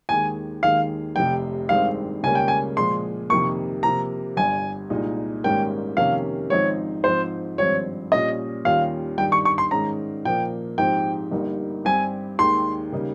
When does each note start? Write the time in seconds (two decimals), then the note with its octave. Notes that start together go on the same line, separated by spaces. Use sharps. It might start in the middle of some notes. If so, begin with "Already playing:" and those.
0.09 D#2 D#3 G#3 G#5
0.63 D#2 D#3 G#3 F5
1.16 F1 F2 C3 G5
1.69 G#1 G2 D#3 G#3 C4 F5
2.23 C#2 C#3 G3 A#3 C#4 G#5
2.35 G5
2.48 G#5
2.77 A#2 F3 G#3 C6
3.29 F2 C3 D#3 A#3 C#6
3.83 C3 F3 A#3 A#5
4.37 G1 G2 G3 G#5
4.90 C2 A#2 G#3 D#4 G#4
5.44 G#1 G#2 G3 A#3 C#4 G5
5.97 F2 C3 D#3 A#3 C#4 F5
6.50 G#1 G#2 F3 C4 D#4 C#5
7.04 G#2 F3 C4 F4 C5
7.58 G#1 G2 F3 C4 C#5
8.12 A#2 G3 C#4 D#5
8.65 D#2 D#3 G3 C#4 F4 F5
9.18 G2 D#3 G3 G5
9.32 C#6
9.45 C#6
9.58 C6
9.71 G#2 D#3 G#3 C#4 A#5
10.25 A#2 F3 A#3 G5
10.78 G#2 F3 C4 D#4 G4 G5
11.31 G1 G2 G3 A#3 D#4
11.85 G2 G3 C4 G4 G#5
12.39 D#2 D#3 G#3 C6
12.92 C#3 G3 A#3 D#4